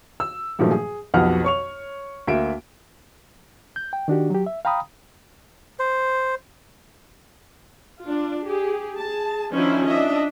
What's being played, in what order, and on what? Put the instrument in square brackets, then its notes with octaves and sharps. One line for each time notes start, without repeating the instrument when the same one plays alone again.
[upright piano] E6
G2 A#2 D#3 F3 F#3 A3
G#4
B1 F2 B2 G4 F#5 F6
C#5 C#6 F7
D2 A#3 E5 D7
[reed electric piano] G6
G5
D#3 D4 F#4 G4
F#3 G4
E5
F5 G5 A#5 B5 D#6
[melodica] C5
[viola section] D4 F4
G4 G#4
G#4 A5
D#3 F3 C#4 D4 E4 C5
D4 D#5 E5